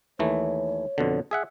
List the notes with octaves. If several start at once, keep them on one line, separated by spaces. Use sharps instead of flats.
D#2 E3 A3 C#5
F2 B2 D3
G#4 E5 F#5